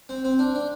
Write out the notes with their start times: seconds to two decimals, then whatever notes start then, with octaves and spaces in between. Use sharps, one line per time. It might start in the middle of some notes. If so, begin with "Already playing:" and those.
0.09 C4
0.25 C4
0.39 D4
0.55 D4